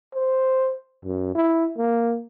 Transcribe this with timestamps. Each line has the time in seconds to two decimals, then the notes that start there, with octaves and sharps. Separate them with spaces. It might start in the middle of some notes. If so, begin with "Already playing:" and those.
0.15 C5
1.05 F#2
1.35 E4
1.77 A#3